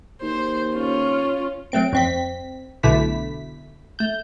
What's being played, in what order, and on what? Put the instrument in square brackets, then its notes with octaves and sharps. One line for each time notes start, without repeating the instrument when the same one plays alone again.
[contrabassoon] D#2 [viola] C5
[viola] C#4 F4
[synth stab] F#3 A3 C4 D7
F2 C4 B6
B1 B2 D3 A3 E4 B6
A3 G6